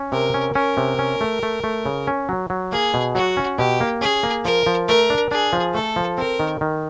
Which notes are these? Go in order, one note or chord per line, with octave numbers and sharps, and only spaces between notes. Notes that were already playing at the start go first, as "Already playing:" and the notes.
Already playing: C#4
C3 A#4
C#4
C#4 A#4
C3
C#4
A3
A3
A3
C#3
C#4
F#3
F#3
A#3 G#4
B2
F#3 F#4
C#4
B2 G4
A#3
C#4 G#4
A#3
F3 A#4
F3
A3 A#4
D4
D4 G#4
F3
A3 A4
F3
C4 A#4
D#3
D#3